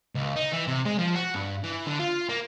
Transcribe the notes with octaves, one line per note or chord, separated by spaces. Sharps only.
C#2
D#4
E3
C3
G#3
F3
F#4
G2
E3
D3
F4
A#3